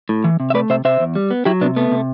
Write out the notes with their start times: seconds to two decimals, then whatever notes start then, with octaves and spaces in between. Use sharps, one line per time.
0.09 A2
0.24 E3
0.40 C3
0.50 E5
0.54 A3 B4 D5
0.70 C3 C5 E5
0.85 C3 C5 E5
1.00 E2
1.15 G3
1.31 B3
1.45 F#3 E4 G4
1.61 C3 B3 D4
1.76 A3 B3
1.92 C3